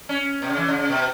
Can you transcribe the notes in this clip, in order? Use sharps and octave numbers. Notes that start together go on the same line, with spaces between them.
C#4
B2
C#3
E3
C#3
C#3
B2